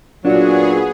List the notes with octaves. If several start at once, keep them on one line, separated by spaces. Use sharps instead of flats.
A#2 F#3 B3 D4 G#4